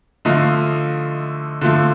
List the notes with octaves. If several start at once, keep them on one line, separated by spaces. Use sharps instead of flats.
D3 F3 A3 D#5 F5
D3 F3 A3